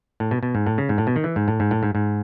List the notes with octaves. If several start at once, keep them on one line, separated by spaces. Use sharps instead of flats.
A2
B2
B2
G#2
A2
C#3
G#2
A2
B2
D#3
E3
G#2
A2
G#2
A2
G#2
G#2